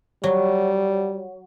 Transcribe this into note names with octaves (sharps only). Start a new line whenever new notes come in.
F#3 G3